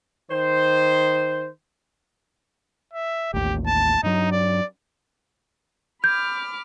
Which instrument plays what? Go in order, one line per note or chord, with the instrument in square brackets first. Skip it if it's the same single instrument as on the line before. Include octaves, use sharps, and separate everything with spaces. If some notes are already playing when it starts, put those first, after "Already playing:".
[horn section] D#3 C5
[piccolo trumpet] E5
[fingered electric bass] A1 D#2 [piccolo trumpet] G4
[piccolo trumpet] A5
[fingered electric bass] G2 F#3 [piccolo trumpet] D#4
[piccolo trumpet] D5
[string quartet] B5 D6 F6 [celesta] G6